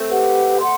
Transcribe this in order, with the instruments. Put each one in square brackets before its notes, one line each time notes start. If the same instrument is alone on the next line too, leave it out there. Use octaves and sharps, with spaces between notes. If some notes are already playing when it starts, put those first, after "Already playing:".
Already playing: [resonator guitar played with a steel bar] A3 C4
[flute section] G4 B4 F#5
F#5 C6